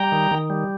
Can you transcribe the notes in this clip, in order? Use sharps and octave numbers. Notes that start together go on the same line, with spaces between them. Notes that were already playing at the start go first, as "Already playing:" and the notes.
Already playing: G3 G5 A#5
D#3
D#3
G3